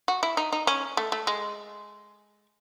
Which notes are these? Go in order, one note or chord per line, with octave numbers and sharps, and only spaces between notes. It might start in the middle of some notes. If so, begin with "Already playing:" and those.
F#4
E4
D#4
D#4
C#4
A3
A3
G#3